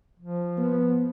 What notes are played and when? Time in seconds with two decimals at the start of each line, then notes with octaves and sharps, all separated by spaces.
0.19 F3
0.57 B3